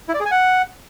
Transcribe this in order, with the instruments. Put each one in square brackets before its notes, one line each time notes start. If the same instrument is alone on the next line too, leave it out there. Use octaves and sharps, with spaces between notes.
[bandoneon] E4
D5
G#4
G#5
F#5